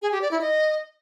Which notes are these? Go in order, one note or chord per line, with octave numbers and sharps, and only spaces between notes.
G#4
G4
D5
E4
D#5